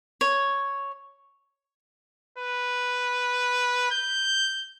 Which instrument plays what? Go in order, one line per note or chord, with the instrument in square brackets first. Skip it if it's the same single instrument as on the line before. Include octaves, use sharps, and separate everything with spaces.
[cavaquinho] C#5
[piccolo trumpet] B4
G6